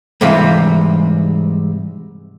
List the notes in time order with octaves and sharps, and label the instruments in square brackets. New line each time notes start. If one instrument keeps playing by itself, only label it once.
[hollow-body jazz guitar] G#2 C3 E3 G3 F5 B5